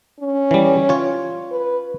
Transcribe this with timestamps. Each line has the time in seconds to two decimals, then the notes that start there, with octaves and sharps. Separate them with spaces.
0.20 C#4
0.51 E3 G3
0.89 F4 C#5
1.52 B4